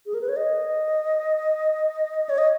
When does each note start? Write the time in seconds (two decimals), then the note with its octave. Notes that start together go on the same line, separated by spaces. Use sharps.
0.06 G#4
0.14 A#4
0.21 B4
0.29 C#5
0.36 D#5
2.29 C#5
2.38 D#5